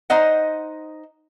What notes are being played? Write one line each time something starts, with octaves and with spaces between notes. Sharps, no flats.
D#4 C5 D#5 F#5